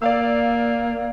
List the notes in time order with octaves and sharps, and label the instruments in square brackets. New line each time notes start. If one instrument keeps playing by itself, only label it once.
[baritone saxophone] A#3 [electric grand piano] D5 F5 E6